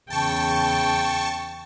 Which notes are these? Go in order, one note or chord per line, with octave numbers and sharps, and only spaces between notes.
E2 C#3 G5 A5 C#6